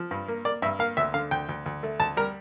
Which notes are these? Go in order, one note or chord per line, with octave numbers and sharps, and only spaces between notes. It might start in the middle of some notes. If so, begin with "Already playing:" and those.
Already playing: F3
G2
A#3
A#3 D5
G2 E5
A#3 F5
D2 E5
D3 F5
D2 G5
D2
D2
A3
D2 A5
G3 A#4